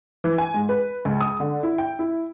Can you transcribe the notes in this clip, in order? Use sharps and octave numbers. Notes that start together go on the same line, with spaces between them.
E3
G#5
G#2
B4
C#2
D#6
D3
E4
G5
E4